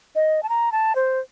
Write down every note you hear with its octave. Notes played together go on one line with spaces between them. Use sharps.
D#5
A5
A#5
A5
C5